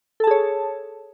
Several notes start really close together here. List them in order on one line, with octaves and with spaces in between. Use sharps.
A4 A5 G#4 C#5